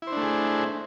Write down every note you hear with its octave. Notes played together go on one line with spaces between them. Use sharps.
A3 D4 E4 G#4 C5